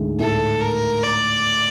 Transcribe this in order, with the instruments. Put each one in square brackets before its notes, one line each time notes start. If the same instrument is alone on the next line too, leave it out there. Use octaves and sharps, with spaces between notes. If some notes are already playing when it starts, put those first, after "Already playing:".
Already playing: [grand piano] D2 G#2 D3 G#3
[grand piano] A2 A3 [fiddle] A4
[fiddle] A#4
D5